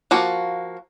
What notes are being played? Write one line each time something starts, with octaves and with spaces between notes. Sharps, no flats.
F3 A#3 F#4